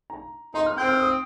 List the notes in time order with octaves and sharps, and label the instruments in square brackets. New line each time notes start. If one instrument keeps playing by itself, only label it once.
[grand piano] A#5
[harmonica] D#4 [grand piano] C6
[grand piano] F6
[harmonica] C4 [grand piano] G6
[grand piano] F6
D#6